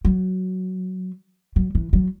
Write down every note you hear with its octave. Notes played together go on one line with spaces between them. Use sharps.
F#3
F#3
E3
F#3